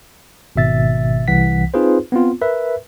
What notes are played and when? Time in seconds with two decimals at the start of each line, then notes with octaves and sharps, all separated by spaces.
0.56 G#1 B2 E5 A6
1.28 C2 E3 F#5 B6
1.74 C4 D#4 F4 G#4 B4 C5
2.12 B3 C4 F4
2.41 A#4 B4 E5